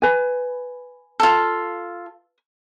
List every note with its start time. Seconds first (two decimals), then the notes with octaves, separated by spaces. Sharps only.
0.02 B4 G#5
1.20 F4 A4